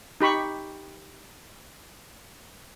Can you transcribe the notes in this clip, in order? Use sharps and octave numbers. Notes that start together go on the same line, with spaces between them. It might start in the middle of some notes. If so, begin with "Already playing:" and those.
D#4 G4 B5 C#6